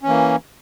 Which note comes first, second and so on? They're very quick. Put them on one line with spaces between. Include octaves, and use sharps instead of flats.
C#4 E3 A#3